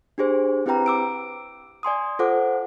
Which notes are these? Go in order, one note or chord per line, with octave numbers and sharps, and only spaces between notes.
D4 G4 G#4 C5
C4 E4 G4 B4 G5 A#5
D6 E6 D7
D5 G#5 C6 D#6
F4 A4 C5 F#5 D6